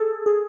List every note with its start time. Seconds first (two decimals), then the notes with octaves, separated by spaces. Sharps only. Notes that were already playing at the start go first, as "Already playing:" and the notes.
Already playing: G#4 A4
0.26 G#4